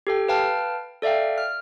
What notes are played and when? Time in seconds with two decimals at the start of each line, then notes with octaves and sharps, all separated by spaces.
0.07 G4 A4 G5
0.28 B4 F5 G5 A5 F6
1.02 A4 D5 E5 F5 G5
1.38 F6